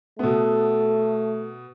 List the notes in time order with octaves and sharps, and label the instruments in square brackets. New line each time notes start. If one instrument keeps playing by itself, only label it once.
[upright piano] B2 B3 [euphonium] A3 [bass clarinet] A4